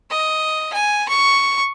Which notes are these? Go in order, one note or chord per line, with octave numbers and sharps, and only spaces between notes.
D#5
G#5
C#6